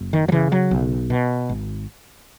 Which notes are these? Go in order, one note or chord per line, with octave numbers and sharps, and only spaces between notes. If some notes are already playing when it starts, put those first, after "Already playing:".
Already playing: F#1
D#3
F#3
C#3 E3
F#3
B1
B2
G#1